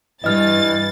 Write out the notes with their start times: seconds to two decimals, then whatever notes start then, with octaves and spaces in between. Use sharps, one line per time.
0.24 G2 E3 D#5 F6 A6